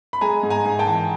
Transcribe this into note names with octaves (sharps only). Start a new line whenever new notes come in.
B5
G#3 G#5 A#5
G#2
G#5 A#5
G#2
G5 A5
E3